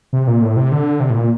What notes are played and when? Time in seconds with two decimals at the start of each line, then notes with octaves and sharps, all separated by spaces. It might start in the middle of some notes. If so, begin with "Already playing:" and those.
0.13 C3
0.28 A#2
0.42 A2
0.57 C3
0.71 D3
1.00 C3
1.10 A2
1.15 A#2